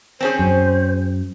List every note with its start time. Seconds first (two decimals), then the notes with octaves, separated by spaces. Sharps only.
0.21 C4 C#4 G#4 C5
0.39 F#2